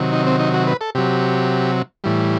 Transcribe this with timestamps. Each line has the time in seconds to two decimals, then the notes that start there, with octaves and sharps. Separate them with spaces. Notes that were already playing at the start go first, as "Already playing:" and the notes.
Already playing: C3 D#3 F#3
0.13 D#4
0.27 C4
0.40 D#4
0.54 F#4
0.67 B4
0.81 A4
0.95 C3 F#3 G4
2.04 A2 E3 G3